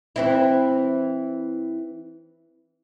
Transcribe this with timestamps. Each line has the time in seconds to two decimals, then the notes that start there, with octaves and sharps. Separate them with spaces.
0.16 E3 C4 E4